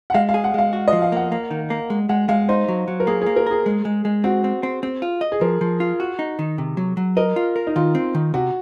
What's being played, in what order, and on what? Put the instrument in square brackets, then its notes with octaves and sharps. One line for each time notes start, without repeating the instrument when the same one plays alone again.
[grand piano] F#5
[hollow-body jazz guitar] G#3 [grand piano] F5
[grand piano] F5
[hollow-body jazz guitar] G#4
[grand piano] F#5
[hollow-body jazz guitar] G#3 [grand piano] F5
[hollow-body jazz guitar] F#4
[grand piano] D#5
[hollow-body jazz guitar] F3
[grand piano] F5
[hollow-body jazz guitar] A#3 [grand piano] F#5
[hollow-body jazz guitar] A#3
D#3
A#3
G#3
[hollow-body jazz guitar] G#3 [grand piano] F#5
[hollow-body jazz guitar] G#3 [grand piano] F5
[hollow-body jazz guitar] D#4 [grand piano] C5
[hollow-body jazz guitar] F#3
F#3
[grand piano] A#4
[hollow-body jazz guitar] A#3 [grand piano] G#4
[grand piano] G#4
[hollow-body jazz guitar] A#3
[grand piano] A#4
[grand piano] G#4 [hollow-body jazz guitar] A#4
[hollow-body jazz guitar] G#3
G#3
G#3
[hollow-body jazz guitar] C4 [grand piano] F#4
[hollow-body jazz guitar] C4
C4
C4
F4
D#5
[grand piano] G#4
[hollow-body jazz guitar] F3 [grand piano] A#4
[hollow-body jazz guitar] F3
F4
F#4
D#4
D#3
C3
F#3
F#3
[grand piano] A#4 [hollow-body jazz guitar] D#5
[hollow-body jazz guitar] F4
A#4
[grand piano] D#4
[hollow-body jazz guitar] D#3 [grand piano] F4
[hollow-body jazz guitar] C4
D#3
[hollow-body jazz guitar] C3 [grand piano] F#4